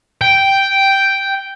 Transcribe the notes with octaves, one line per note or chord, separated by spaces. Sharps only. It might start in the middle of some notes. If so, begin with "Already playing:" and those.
G5